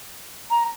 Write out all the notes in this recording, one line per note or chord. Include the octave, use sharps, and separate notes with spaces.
A#5